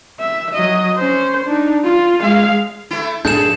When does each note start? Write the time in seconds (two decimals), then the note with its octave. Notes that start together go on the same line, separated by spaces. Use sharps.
0.20 E5
0.55 F#3 D#5
0.98 C#4 C5
1.45 D4 D#4
1.85 F4
2.21 G#3 F5
2.91 A3 E4
3.25 F#2 A2 D4 G#4 A4 G6 E7